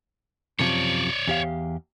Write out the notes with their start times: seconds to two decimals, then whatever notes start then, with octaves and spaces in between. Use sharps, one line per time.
0.59 F#2 C3 F3 C#5 D5
1.27 E2 G4 F5